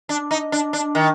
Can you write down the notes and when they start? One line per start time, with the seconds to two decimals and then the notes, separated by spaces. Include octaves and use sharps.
0.09 D4
0.31 D#4
0.52 D4
0.73 D4
0.95 D#3